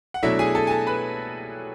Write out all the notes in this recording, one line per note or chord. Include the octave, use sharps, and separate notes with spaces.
F#5
B2 F#3 A3 D4 E4 E5
G#4 G#5
A4 A5
G#5
A4 A5
B4 B5